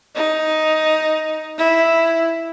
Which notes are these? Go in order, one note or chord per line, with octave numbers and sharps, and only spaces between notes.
D#4
E4